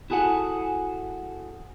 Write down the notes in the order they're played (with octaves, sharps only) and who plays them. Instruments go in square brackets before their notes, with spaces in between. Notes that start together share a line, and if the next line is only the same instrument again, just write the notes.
[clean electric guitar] E4 F#4 G#4 A4 F#5